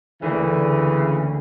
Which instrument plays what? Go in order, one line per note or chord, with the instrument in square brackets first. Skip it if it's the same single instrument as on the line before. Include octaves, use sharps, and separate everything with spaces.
[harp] D2 A#3 [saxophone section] C#3 E3